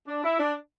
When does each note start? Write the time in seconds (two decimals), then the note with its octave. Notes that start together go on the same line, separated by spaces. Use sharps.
0.07 D4
0.23 E4
0.39 D4